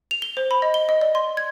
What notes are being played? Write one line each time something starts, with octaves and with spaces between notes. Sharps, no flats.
F7
G7
C5
B5
D#5
G7
D#5
D5
C6
G#6